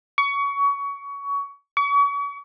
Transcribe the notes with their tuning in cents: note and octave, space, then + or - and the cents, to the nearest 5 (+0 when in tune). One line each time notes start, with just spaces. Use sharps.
C#6 +25
C#6 +40